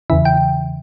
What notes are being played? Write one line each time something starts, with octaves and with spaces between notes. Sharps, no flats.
E2 C#3 E3 E5
G5